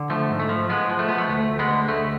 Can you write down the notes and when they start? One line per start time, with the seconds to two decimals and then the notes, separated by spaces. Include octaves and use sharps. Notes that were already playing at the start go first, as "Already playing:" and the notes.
Already playing: D3
0.10 F3 A3
0.30 G#2
0.39 A3
0.49 F3
0.69 F3 G#3 B3
0.89 F3
0.99 A3
1.09 F3 B3
1.18 A3
1.28 D2 A3
1.49 D2
1.59 G#3 B3
1.69 D3
1.88 D2 A3